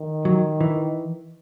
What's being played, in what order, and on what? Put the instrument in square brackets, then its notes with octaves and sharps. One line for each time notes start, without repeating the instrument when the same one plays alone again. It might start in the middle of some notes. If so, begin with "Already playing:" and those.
Already playing: [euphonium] D#3
[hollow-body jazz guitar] F#3
E3